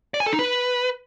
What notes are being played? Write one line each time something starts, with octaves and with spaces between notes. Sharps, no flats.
D5
G#5
A4
D#4
B4